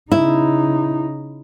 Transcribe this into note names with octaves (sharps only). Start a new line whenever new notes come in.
C#3 D#4 E4